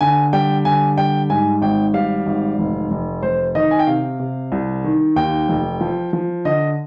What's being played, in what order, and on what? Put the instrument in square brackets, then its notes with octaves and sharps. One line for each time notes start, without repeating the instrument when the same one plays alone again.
[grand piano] D3 G#5
G3 G5
D3 G#5
G3 G5
G#2 G#5
G#1 G5
G3 F5
G#1
F1
F1
F1 C5
D#3 D#5
G#5
G5
C3 F5
C3
C2
D#3
D#2 G5
F1
F3
F3
D3 D#5